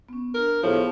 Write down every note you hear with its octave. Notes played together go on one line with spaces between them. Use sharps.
B3 C#4
D4 A#4
A2 F3 B3 G4 G#4